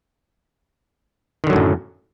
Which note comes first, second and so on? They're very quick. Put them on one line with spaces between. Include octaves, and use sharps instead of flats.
D#3 D3 F#3 A2 F#2